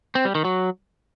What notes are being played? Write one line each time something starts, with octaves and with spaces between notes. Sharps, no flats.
C4
G3
D#3
F#3